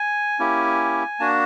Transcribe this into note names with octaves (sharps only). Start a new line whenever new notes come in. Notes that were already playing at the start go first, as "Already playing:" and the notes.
Already playing: G#5
A#3 C#4 E4 G4
A#3 D4 F#4 A5